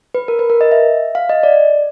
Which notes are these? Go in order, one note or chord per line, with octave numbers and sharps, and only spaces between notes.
B4
A#4
B4
A#4
D#5
E5
F5
D#5
D5